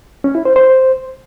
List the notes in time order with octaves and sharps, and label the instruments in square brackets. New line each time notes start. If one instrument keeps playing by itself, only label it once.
[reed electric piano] C#4
E4
C5
C5